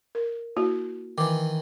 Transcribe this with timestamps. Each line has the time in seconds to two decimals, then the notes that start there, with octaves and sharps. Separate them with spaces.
0.15 A#4
0.56 A#3 E4 F#4
1.18 D#3 E3 D6